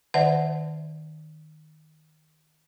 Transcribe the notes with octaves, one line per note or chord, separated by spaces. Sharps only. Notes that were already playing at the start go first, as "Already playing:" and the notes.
D#3 C5 D5 E5 F#5 A5